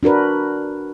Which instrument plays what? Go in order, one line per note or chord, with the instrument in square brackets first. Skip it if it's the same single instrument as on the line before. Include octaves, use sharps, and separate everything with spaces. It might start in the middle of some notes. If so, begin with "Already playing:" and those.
[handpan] D4 F#4 A#4 B4